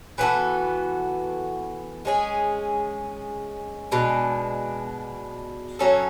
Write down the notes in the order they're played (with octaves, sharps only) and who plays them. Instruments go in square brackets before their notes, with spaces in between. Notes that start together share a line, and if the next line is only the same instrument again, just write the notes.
[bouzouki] E3 B3 F#4 A4
G#3 C#4 G#4
B2 G#3 D4
F#3 C#4 F#4 A4